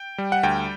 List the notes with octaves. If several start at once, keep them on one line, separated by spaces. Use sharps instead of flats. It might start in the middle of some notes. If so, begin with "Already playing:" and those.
Already playing: G5
G3
F#5
D2 G5